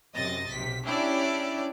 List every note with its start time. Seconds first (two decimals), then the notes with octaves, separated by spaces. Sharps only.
0.15 F#2 C3 D#5 A6 A#6
0.48 B1 C3 B6
0.85 C#4 D4 E4 G4 C#5 D5